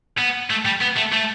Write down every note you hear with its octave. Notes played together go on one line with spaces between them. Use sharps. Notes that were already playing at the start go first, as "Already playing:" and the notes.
B3
A3
G3
B3
A3
A3